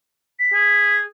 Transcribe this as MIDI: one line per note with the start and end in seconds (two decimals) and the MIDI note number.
0.39 0.96 95
0.53 1.02 68